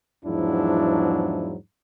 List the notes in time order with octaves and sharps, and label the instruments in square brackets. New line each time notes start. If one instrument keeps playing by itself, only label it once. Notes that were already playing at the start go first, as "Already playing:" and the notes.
[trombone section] E2 G#2 F3 F#3 D4 E4